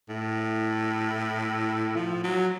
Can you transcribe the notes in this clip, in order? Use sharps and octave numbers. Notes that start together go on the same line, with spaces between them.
A2
F3
F#3